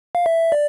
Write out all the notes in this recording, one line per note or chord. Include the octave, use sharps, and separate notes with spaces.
F5
E5
D5